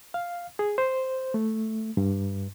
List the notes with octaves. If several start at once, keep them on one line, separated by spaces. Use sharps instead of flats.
F5
G#4
C5
A3
G2